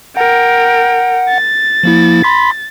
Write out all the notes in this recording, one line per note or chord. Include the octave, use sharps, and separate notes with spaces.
A#4 F#5 G5
A6
F3 A#3 E4
B5 C6 B6